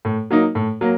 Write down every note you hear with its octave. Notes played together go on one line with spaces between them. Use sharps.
A2
F#3 A#3 D#4
A2
F#3 A#3